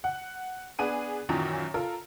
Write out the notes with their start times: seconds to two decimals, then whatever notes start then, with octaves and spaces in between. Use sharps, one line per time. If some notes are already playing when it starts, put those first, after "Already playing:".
0.04 F#5
0.79 B3 D4 G#4 D#7
1.29 F#2 A#2 D#3 E3 F#3
1.74 F4 A4 A#4